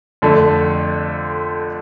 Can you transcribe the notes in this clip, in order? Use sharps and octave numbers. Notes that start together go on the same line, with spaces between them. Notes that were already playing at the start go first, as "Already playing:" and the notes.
F2 D3 A3